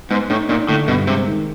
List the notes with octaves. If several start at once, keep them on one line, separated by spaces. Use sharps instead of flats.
G#2 B3
A2 D#4
A#2 D#4
A2 D3
G2 B2
C3 G#3
D#3